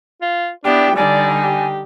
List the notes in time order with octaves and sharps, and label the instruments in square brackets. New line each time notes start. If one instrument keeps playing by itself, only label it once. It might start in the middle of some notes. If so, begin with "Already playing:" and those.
[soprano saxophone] F4
[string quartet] B3 E4 G4 [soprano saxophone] D4 [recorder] G5
[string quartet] D3 G3 D#4 [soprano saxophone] D5 [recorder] G#5
[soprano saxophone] G4